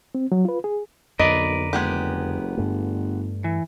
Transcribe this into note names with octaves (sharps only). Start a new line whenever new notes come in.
C4
F#3
F4 B4
G#4
B1 F2 D3 A#4 B4 D5 D#5
F#1 G#3 B3 G4
G1 G2 A3
E3